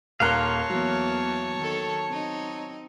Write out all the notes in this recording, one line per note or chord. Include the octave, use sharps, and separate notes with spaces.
D#1 A#3 C#5 F5 A5 A#5 C6 F#6
E2 E3 F#3 A#3
D#3 A4
C4 D#4